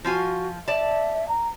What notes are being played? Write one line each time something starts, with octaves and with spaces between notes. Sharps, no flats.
F3 F4 F#4 G#5
D5 E5 A5
A#5